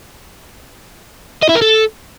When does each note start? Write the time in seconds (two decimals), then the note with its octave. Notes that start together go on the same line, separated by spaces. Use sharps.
1.43 D#5
1.49 E4
1.55 A#4
1.62 A4